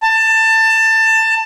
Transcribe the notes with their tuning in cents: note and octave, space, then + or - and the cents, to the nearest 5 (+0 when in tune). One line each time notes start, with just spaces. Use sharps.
A5 +20